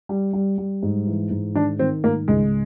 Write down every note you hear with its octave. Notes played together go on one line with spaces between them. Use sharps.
G3
G3
G3
G#2
E3
G#2
D#3 D4
D#3 C4
G#2 A#3
C#2 G#3